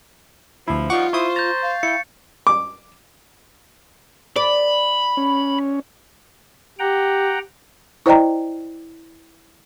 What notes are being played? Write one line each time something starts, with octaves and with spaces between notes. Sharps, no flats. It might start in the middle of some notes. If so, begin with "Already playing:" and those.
D2 G2 F3 E4
F3 G3 D#4 F4 F#5 C#6 D6
E4 C5 C#6 D#6
A#5 G6 A6
F5
E4 G5 C#7
D6
D5 B5
C#4
G4 F#5 G5 A#5
E4 C5 D5 D#5 G5 A#5